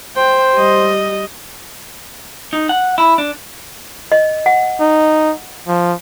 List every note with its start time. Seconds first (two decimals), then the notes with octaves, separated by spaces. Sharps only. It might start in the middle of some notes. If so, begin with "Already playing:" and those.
0.17 C5 G5
0.56 G3 D#5
2.53 D#4
2.69 F#5
2.98 E4
3.18 D4
4.12 D#5
4.46 F#5
4.80 D#4
5.68 F3